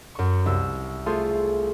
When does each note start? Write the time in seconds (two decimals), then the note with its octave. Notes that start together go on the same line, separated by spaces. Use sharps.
0.15 F#2 C#6
0.46 C2 E6
1.06 A3 F4 G#4 C5